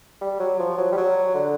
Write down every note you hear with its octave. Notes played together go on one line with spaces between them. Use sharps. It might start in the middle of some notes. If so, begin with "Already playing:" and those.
G3
F#3
F3
F#3
G3
F#3
D3